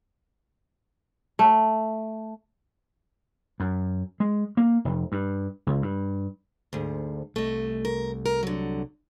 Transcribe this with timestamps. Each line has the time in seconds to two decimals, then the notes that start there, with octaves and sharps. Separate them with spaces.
1.39 A3
3.60 F#2
4.20 G#3
4.57 A#3
4.85 F1
5.12 G2
5.67 C#2
5.82 G2
6.73 D2 G#2
7.36 C2 A3 D#5
7.85 A#4
8.26 A#4
8.43 D3 F#3